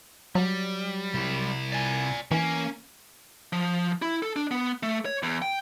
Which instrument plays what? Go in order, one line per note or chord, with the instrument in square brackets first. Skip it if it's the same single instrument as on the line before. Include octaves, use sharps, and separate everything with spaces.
[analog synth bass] F#3 [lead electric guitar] G3
[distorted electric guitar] C2 E4
[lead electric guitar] D5 G#5
[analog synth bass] E3 [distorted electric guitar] A#3 [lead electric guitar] C#4
[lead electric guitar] F3
E4
A4
D4
B3
A3
C#5
E2
G5